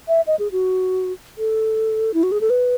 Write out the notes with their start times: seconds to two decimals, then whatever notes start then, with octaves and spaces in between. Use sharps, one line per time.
0.08 E5
0.27 D#5
0.39 G#4
0.52 F#4
1.38 A4
2.14 E4
2.23 F#4
2.32 G#4
2.41 A4
2.50 B4